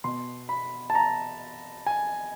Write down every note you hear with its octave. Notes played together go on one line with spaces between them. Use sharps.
B2 C6
B5
A5
A#5
G#5